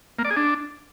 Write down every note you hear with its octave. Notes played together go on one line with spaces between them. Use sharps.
A#3
D5
G#4
D4